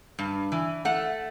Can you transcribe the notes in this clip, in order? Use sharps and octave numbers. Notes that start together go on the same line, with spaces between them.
G2
E3
A3 F#5